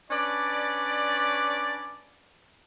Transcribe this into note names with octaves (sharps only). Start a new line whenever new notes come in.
C#4 D4 B4 D5